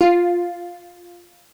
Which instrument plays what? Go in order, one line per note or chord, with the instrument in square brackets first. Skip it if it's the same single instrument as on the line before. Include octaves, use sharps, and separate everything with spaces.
[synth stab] F4